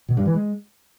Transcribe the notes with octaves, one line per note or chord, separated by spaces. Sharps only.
B2
G2
E3
G#3